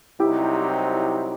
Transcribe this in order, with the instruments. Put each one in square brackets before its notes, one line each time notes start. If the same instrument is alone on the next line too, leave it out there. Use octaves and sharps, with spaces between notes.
[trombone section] C2 C3 F#3 C4 D#4 [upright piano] E4 G4